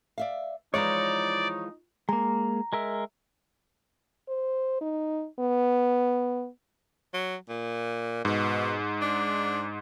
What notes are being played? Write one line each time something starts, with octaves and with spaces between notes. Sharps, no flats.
D5 E5 F5
E3 F3 G#3 D#4 C#5 D5 A#5
G#3 A#3 A#5
G#3 A#4 E5
C5
D#4
B3
F#3
A#2
G#2 B2
D4